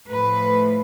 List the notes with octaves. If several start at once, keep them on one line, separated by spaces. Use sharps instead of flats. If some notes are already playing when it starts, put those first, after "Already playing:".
A2 F3 A3 B4